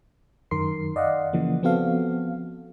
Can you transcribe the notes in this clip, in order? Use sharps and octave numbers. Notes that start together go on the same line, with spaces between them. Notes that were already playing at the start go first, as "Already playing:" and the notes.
F#2 D#3 A#4 C6 C7
D5 D#5 F5 F#5
C#3 E3 F3 A#3
F3 B3 C4 F#4 A4 F5